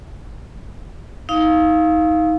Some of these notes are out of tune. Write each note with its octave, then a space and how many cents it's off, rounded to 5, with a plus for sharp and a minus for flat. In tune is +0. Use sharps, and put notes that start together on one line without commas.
D#4 +25 F5 +0